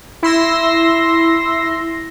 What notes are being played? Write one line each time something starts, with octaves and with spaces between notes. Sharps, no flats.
E4 C6 E6 A#6